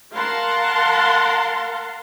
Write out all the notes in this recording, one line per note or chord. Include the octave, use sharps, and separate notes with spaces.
A#4 F5 F#5 A5 A#5 C6